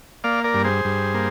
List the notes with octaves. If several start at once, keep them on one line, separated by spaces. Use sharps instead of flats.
A#3 D5 F5
A#4 D5
G2
G#4 C5
G2
A#3